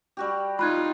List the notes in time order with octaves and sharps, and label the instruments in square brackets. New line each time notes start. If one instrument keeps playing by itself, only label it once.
[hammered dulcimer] G3 F#4 G4
[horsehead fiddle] D#4 F4 [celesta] B5 F#6 G#6